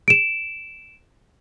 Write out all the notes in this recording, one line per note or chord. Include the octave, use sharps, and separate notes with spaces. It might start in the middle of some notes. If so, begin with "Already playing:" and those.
D7 E7